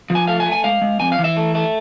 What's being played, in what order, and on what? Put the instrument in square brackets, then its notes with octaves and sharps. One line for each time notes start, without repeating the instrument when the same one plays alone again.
[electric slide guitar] F3
G#5
A3 F5
G#5
A3
G#5
G#3 F5
G#3
F2 G#5
F5
E3
E5
A3
A3